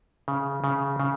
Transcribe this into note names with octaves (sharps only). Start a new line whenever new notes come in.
C#3
C#3
C#3